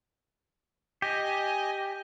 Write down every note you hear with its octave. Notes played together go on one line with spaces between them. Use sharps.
G4 D#5 G#5